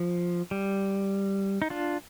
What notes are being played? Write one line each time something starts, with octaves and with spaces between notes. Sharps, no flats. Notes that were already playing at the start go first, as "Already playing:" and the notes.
Already playing: F3
G3
D#4
D4 F4